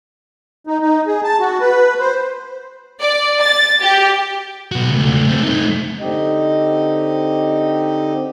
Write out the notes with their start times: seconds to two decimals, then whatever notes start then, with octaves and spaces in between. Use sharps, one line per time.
0.67 D#4
0.81 D#4
1.07 G#4
1.24 A5
1.40 F#4
1.61 B4
2.00 C5
3.00 D5
3.40 A6
3.81 G4
4.72 B1 F#4
4.91 C#2 A3
5.28 A3 C4
5.43 A3 D#4
5.99 D3 C4 D#4 G4 D#5